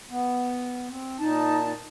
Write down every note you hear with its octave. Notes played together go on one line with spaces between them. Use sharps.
B3
C4
A#2 D#4 A5